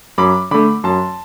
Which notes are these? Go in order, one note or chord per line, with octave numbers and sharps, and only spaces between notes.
F#2 B5 D6
D3 A3 B5 D6
F#2 A5 C6